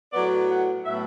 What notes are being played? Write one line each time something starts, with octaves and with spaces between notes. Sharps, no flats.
A2 F#3 B3 D5
F#5
A2 F#3 B3 E5